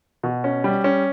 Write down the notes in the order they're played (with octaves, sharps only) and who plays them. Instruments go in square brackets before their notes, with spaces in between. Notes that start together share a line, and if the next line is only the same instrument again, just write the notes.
[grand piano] B2
C#4
G3
C#4